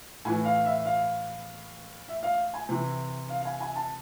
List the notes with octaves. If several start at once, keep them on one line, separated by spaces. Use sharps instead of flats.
A2 E3 G#5
F5
E5
F5
E5
F5
G#5
C3 E3
F5
F5
G#5
G#5
A5